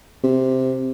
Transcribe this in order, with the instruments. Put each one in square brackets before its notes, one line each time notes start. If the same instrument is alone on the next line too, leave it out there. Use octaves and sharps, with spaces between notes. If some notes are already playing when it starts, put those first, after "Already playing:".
[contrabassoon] C3